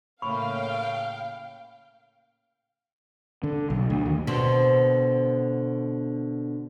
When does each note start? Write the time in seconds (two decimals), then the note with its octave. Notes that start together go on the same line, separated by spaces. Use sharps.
0.22 A2 C#3 A#3 F5 G5 B5 C#6
3.43 D3
3.70 B1
3.90 D2
4.06 D#2
4.27 B2 D3 C4